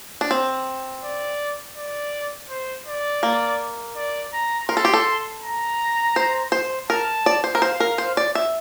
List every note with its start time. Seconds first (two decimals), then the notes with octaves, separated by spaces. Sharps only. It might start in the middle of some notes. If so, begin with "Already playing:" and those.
0.21 D4
0.31 C4
1.04 D5
1.77 D5
2.50 C5
2.86 D5
3.23 A#3
3.96 D5
4.33 A#5
4.69 A#4 C6
4.77 A4
4.85 G4
4.94 A4
5.43 A#5
6.16 C5
6.52 C5
6.89 A#4 A5
7.26 D5
7.44 C5
7.55 A#4
7.62 C5 F5
7.80 A#4
7.98 C5
8.17 D5
8.35 E5